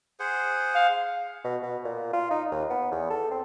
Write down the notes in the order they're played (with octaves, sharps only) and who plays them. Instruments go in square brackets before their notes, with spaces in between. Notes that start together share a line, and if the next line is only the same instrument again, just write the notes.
[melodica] G#4 C5 F#5
[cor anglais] F5
[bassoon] B2
B2
A#2
F4
D#4
D#2
B3
E2
A4
C4